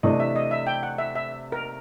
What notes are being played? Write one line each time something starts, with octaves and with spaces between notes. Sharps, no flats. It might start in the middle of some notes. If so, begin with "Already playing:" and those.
C3 E3 A3 D4 D#5
E5
D#5
E5
G5
F#5
E5
E5
A#4